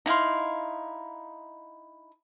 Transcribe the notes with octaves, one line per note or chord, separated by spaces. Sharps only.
D#4 E4 F5 C6